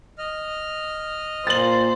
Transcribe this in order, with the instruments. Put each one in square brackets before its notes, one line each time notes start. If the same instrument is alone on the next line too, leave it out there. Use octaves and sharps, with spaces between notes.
[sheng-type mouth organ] D#5 F6
[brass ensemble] A#2 [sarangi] C5 [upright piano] A6 F#7